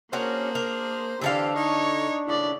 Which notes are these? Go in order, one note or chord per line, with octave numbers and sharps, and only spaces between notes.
A#3 C#4 D4 F#4 G#4 A#4 C5
A#4
D3 E3 C4 D4 G4 A4 F5
D#4 C#5
D#2 A2 C#3 E4 D5